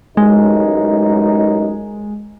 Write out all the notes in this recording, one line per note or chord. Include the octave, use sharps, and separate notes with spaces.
A1 F#2 G#3 D#4